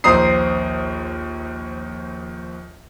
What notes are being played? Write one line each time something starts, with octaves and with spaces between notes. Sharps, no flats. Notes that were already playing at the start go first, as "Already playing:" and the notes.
A#1 D#2 C5 A#5 D#6 C7